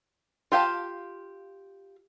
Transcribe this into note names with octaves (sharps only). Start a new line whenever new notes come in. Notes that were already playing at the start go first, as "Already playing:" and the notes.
F4 G4 F5 A5